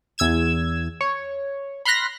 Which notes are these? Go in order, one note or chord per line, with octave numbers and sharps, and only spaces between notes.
E2 E6 G#6 E7
C#5
B5 C6 F6 F#6 A#6